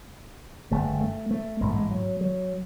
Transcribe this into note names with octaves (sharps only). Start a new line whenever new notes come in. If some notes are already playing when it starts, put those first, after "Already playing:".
G1 F#2 C#3 A3
A3
A3
A1 G#2 G#3
A3
G#3
F#3
F#3